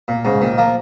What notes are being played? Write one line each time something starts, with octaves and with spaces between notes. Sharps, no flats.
A#2
G#2 C#3
A#2 D#3
F3 A#3